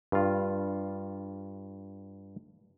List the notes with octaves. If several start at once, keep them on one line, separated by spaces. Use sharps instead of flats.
G2 F4